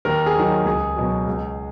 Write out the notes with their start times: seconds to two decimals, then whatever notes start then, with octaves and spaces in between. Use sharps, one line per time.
0.05 D#2 A#4
0.26 G#4
0.35 D#3 F#3
0.66 C#2 G#4
0.96 B2 F#3
1.27 C#2